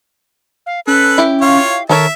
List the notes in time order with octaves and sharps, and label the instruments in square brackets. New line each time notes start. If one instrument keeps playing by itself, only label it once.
[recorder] F5
[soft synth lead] C#4 [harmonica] A4 B4 [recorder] F#6
[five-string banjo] E4 G4
[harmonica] F4 C#5 [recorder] F5
[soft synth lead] D#3 [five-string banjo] A4 A#4 C#5 [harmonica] E5 [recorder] A5